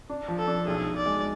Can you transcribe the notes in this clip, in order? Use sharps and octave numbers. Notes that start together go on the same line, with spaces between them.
D4
F3
A4
D4
B1 G#4
B1
D5
G#3